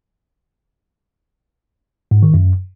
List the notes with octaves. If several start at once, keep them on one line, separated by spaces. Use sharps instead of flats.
G#2
D#3
F#2